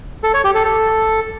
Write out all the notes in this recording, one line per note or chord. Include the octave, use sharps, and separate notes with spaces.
A4
C#5
G4
A4
A4